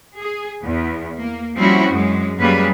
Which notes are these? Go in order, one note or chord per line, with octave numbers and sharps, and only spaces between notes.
G#4
E2
A#3
F3 G3 C4 C#4 E4 F#4
F#2 G#3
F#2 G3 A#3 G#4 B4